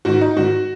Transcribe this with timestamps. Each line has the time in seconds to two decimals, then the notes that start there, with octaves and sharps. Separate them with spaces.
0.05 G#2 D#3 F#4
0.21 D#4
0.37 G#2 D#3 F#4